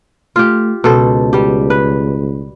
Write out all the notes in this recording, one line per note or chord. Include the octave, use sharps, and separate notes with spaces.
A3 F4 G4
C#2 B2 A4 C5
G3 G4
B4